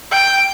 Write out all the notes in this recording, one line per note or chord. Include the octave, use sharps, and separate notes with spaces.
G5